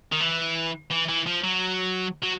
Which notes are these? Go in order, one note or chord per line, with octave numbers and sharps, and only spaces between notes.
D#3
E3
E3
E3
F3
F#3
F#3